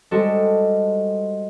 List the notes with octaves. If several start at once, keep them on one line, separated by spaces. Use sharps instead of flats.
G3 G#3 C4 F#4 A4